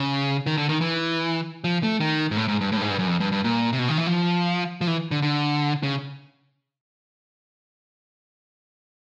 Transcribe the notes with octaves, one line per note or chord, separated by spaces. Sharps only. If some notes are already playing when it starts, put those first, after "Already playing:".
Already playing: C#3
D#3
D3
D#3
E3
F3
A3
D#3
G#2
A2
G#2
G2
A2
G2
G#2
G2
F#2
F2
G2
G2
A#2
C3
B2
D#3
E3
F3
F3
E3
D3
D3
C#3